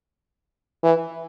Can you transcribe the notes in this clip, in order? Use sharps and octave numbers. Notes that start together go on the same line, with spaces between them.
E3